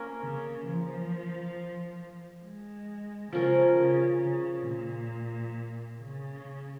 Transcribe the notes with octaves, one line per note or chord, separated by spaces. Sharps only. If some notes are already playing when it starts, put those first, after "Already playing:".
Already playing: A#3 C#4 A#4
C#3
F3
G#3
C#3 F3 C#4 A#4
C#3
C#3
A#2
C#3